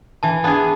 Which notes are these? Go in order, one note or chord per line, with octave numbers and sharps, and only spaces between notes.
E3 A5
B3 D4 G#4 A5